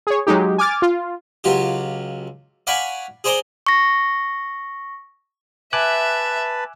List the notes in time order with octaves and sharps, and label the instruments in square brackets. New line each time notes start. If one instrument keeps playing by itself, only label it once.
[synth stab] G#4 C#5
F#3 G#3 D#4 G4
G#5 D6 F6 A6
F4
[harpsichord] C#2 F#3 F4 G4
D5 F5 F#5 G#5 B5 C#6
G#4 C5 D5 A#5 C6 D6
[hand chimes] C#6 A#6
[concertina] B4 A5 [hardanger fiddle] E5 [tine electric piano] G#5 D6 F#6